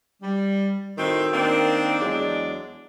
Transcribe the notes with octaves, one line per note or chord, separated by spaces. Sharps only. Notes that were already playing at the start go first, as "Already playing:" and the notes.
G3
A2 D#3 C4 F#4
D#3 A#3 C4 D4
E2 F#3 G#3 D4